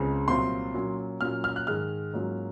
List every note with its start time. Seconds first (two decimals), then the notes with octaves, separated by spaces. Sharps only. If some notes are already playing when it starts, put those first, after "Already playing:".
Already playing: C#2 C#3 G#3 C4
0.28 C2 A#2 F#3 C4 F4 C6
0.74 A#2 F#3 C#4
1.21 A#2 F#3 C#4 F4 F6
1.44 F6
1.56 F#6
1.67 G#2 D#3 G#3 F6
2.13 G#2 F#3 A#3 C#4 F4